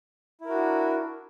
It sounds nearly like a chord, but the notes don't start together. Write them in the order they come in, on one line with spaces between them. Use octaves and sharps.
E4 A#4 F#4 D4